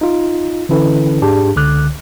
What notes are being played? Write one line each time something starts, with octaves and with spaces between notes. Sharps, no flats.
D#4 F4
D3 E3 C#4 E4 A4 B4
G#2 D4 G4 G#4 A5
C#2 D3 D6 F#6